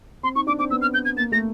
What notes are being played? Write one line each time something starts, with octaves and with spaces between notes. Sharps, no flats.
C4 C6
D#4 C#6
D4 D6
C4 D6
B3 E6
F6
G6
G#6
A#3 A6
A3 A#6